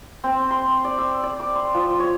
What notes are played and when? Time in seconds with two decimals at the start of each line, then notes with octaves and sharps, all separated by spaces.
0.24 C4
0.51 C6
0.84 D5
0.98 E6
1.23 D5
1.40 D6
1.55 C6
1.74 F3
2.00 C#5